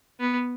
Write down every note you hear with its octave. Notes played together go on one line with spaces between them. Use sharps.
B3